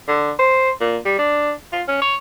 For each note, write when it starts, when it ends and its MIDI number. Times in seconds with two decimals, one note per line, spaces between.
0.08 0.31 50
0.39 0.70 72
0.81 0.98 46
1.05 1.15 55
1.19 1.52 62
1.73 1.83 65
1.88 1.98 61
2.02 2.16 73